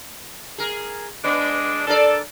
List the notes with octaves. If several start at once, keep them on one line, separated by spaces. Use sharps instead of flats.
G#4 A#4
G#3 B3 D4
D4 A4 A#4 D5